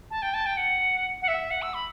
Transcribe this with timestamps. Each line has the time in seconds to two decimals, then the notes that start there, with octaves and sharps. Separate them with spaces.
0.10 A5
0.22 G5
0.33 A5
0.45 G5
0.56 F#5
1.21 F#5
1.27 E5
1.50 F#5
1.62 E6
1.73 B5